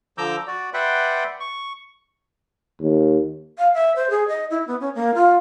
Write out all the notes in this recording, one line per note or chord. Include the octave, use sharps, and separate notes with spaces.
D3 F3 A#5 D6 E6 G6
F#4 D5
B4 D5 E5 F#5 G5 C6
C#6
D#2
F5
E5
C5
G#4
D#5
E4
B3
C#4
A#3
F4